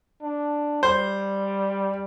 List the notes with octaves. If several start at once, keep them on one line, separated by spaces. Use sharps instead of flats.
D4
G3 C5